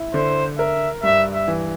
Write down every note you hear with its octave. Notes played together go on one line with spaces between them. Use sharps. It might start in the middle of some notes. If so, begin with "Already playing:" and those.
Already playing: E4
D3 C5
A#4 E5
G2 E5
E5
E3